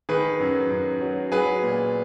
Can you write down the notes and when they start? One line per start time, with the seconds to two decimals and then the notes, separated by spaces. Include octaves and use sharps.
0.09 D#3 G#4 B4
0.40 F#2
0.71 F#2
1.01 F#3
1.32 F#3 G#4 B4
1.63 A#2